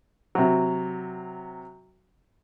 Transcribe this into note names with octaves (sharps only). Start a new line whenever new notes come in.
C3 F#3